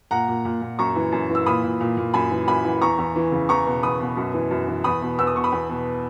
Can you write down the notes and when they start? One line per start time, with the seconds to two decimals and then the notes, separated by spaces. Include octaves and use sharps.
0.11 A#2 F#5 A#5
0.28 A#2
0.45 A#2
0.61 A#2
0.79 F#2 A#5 C#6
0.96 E3
1.12 F#2
1.30 E3
1.35 E6
1.46 A#2 B5 D#6
1.63 A#2
1.81 A#2
1.97 A#2
2.14 F#2 G#5 B5
2.31 E3
2.47 F#2 G#5 B5
2.64 E3
2.81 E2 A#5 C#6
2.98 E2
3.16 E3
3.32 C#3
3.49 E2 A#5 C#6
3.66 B2
3.83 E2 B5 D#6
4.00 B2
4.17 F#2
4.34 E3
4.51 F#2
4.68 E3
4.84 E2 B5 D#6
5.02 B2
5.18 E2 E6
5.27 D#6
5.35 B2 C#6
5.44 B5 D#6
5.52 E2
5.69 B2